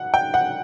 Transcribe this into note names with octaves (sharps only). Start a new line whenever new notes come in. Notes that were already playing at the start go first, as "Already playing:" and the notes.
Already playing: F#5
G5
F#5